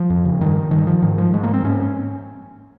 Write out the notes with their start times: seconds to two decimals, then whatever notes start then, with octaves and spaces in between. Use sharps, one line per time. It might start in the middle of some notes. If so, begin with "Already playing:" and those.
Already playing: F3
0.10 F2
0.25 C#3
0.41 G2 D#3
0.71 G2 D#3
0.87 F3
1.02 G#2 D#3
1.18 F3
1.33 G#2 G#3
1.43 A#3
1.54 C4
1.64 G#2 C#4